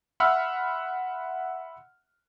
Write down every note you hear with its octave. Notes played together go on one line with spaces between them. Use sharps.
E5 F#5 B5 C6 E6 F6